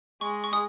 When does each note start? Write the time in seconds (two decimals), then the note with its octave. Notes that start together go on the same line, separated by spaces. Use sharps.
0.21 G#3 C#6
0.44 C#6
0.53 D#6